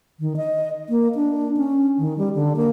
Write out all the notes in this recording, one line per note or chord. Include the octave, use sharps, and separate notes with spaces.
D#3
D#5
A#3
D4
C#4
D#3
G3
D3
A#3